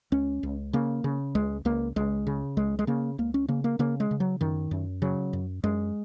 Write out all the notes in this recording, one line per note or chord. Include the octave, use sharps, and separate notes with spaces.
C#2 C#4
C#2
C#3 A#3
C#3
C#2 G#3
C#2 A#3
C#2 G#3
C#3
C#2 G#3
G#3
C#3 A#3
C#2 A#3
C#4
C#3 A#3
A#3
C#3 A#3
G#3
C#3
F#3
F#2 D#3
F#2
C#3 F#3
F#2
F#2 G#3